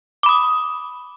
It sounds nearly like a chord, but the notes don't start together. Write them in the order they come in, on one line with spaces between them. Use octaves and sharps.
D6 B5 D#6